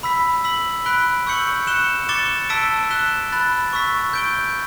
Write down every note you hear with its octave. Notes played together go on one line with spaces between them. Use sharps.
B5 E6 B6
E6 B6 F#7
B5 F#6 B6 D7 G7
C#6 E6 G6 C#7 F#7
F#6 C#7 E7 G7
D6 A6 C#7 E7 G7
A5 E6 B6 D7
F#6 B6 E7 G7
B5 F#6 A6
C#6 E6 B6
G6 D7 G7